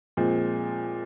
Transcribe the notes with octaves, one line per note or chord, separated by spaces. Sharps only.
A#2 F3 G#3 C4